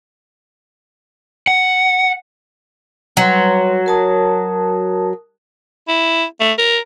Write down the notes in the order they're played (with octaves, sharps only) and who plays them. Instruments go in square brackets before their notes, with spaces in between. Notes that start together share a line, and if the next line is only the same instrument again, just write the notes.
[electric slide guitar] F#5
[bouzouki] F#3 [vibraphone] G3 B4 C6
[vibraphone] A#4 A5 D#6
[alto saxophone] E4
A3
A#4